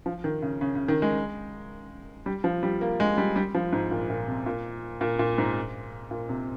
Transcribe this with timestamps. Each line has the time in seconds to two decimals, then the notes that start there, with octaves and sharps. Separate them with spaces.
0.06 F3
0.24 D#3
0.42 C#3
0.61 C#3
0.75 C#3
0.88 D#3
1.02 G#3
2.26 G3
2.44 F3
2.63 G3
2.81 A#3
3.00 G#3
3.18 G3
3.36 G3
3.54 F3
3.73 G#2
3.91 A#2
4.10 A#2
4.28 C3
4.46 A#2
5.01 A#2
5.19 A#2
5.38 G#2
6.11 A#2
6.29 C3